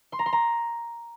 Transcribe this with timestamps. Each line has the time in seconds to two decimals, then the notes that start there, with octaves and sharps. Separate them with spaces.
0.12 C6
0.19 A#5
0.26 C6
0.33 A#5